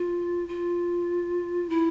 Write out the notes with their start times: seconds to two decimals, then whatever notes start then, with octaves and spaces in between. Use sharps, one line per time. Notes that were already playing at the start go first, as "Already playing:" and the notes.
Already playing: F4
0.48 F4
1.69 E4